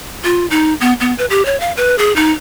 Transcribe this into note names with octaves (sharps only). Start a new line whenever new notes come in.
F4
D#4
B3
B3
B4
G4
C#5
F5
B4
G#4
D#4